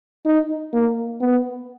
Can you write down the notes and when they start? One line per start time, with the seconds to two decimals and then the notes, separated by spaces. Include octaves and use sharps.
0.26 D#4
0.73 A#3
1.21 B3